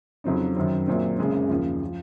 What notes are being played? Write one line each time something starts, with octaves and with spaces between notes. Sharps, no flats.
F2 C#3 F#3 C4 D#4
F#2 D#3 F#3 C4
A#1 A#2 F#3 C4
F#1 F#2 C#3 G#3 C4
D#2 C#3 F3
F3